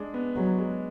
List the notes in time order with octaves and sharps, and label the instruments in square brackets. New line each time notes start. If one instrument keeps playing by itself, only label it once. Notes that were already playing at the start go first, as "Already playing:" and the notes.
Already playing: [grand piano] G#3 D4
B3
[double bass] F#3 [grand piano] G#3
[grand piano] G#3